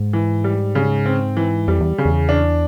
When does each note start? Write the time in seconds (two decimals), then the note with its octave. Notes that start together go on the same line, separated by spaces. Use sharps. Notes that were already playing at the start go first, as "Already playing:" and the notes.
Already playing: G#2
0.13 E3
0.44 G3
0.75 C#3
1.06 C4
1.37 E3
1.68 F2 G3
1.81 E2
1.98 C#3
2.05 E2
2.29 D4